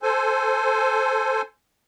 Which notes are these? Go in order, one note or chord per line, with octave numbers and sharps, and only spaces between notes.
A4 C5 G#5